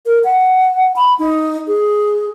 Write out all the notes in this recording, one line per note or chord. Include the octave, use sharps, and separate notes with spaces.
A#4
F#5
B5
D#4
G#4